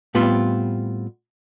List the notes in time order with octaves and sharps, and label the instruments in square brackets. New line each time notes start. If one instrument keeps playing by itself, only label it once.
[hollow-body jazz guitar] A2 G3 B3 C4 F4